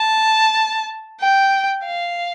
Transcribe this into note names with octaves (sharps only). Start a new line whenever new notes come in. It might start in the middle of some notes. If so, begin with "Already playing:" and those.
Already playing: A5
G5
F5